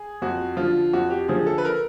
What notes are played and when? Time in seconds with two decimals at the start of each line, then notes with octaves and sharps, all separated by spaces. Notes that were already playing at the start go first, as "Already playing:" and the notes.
Already playing: G#4
0.22 F2 F#4
0.57 D3 F3 F4
0.93 F2 F#4
1.10 G4
1.28 D3 F3 G#4
1.47 A4
1.58 B4
1.65 A#4